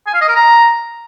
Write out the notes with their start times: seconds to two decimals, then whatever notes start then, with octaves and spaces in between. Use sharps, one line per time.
0.07 G#5
0.14 F5
0.21 D#5
0.29 A#4
0.36 A#5